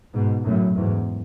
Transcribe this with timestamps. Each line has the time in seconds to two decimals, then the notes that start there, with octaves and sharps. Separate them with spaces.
0.14 G#2 B2
0.44 F#2 A2
0.76 E2 G#2